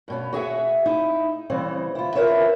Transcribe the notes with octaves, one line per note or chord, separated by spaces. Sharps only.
G2 B2 C#4
F#4 G#4 E5 F#5
D#4 E4
C#3 E3 G3 C4
E4 F4
F4 A#4 B4 C#5 E5